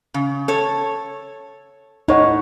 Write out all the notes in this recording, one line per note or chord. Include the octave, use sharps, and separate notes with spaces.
C#3
A4 C#5
A2 D#4 C#5 F#5